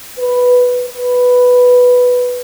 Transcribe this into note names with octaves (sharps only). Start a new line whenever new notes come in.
B4
B4